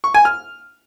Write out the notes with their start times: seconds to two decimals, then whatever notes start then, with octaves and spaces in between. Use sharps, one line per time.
0.04 C#6
0.14 G#5
0.25 F6